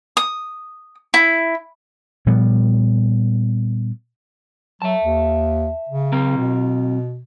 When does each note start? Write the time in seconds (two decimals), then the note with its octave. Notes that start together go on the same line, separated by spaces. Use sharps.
0.17 D#6
1.14 E4
2.26 A#2 F3 G3 B3
4.82 F#3 E5 A5
5.03 D#2
5.89 C#3
6.12 F#3 C4 A#5
6.38 B2